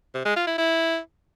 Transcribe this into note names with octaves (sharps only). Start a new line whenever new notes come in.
C3
G#3
F4
E4
E4